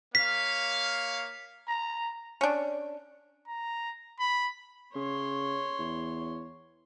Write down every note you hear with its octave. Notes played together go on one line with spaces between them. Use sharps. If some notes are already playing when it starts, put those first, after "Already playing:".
A#3 C#5 F5 B6
A#5
C#4 D4
A#5
B5
C#3 C#5 C6
E2